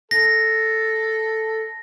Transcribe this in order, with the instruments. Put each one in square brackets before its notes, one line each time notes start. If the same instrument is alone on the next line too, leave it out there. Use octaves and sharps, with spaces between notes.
[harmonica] A4 [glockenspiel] A#6